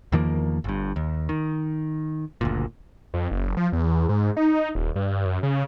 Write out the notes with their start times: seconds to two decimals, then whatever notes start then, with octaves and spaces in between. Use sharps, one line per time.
0.12 E2 D#3 F3 A#3
0.64 G1 G2
0.96 D#2
1.29 D#3
2.41 F#1 D2 A#2
3.14 F2
3.32 F#1
3.57 F3
3.73 E2
4.09 G#2
4.37 D#4
4.75 D#1
4.96 G2
5.25 F#2
5.43 C#3